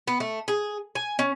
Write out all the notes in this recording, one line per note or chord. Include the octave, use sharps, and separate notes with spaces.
B3
A3
G#4
G#5
C#4